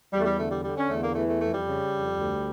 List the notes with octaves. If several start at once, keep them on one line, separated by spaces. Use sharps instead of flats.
E2 G3
A3
G3
D3 A3
G3
D3 G3
C#4
E2 A3
A#3
E3 A3
A3
F2 A3
G3
C#3
F2
D2